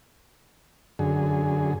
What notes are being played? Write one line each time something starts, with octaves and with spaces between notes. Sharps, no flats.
F#2 D3 G#4